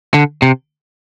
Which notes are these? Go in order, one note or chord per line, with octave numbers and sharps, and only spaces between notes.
D3
C3